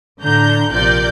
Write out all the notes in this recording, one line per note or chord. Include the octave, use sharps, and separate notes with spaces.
A2 D3 D4 A#5 G6
A#1 C3 F4 A#4 D5 G6